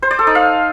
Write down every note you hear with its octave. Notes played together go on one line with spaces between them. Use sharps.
C5
D5
A4
D#4
F5